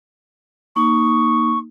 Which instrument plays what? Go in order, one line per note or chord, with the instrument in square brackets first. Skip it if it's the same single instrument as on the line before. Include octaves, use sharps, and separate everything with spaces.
[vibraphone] A#3 D#4 D#6 [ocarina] C#6